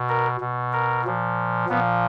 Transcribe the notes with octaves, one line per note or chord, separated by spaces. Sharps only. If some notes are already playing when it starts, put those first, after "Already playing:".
Already playing: B2
A#4
B2
A#4
A#2 F3
A#2 F3 B3